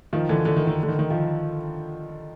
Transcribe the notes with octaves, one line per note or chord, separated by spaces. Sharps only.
D#3 F3
D3 E3
D3
D#3
D#3
D3
D#3
D#3
D#3 F3